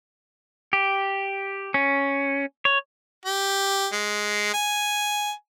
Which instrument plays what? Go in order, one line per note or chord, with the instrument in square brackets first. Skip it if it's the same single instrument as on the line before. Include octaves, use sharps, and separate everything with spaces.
[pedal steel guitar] G4
C#4
C#5
[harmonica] G4
G#3
G#5